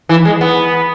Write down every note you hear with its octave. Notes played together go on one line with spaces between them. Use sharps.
E3
G#3
B3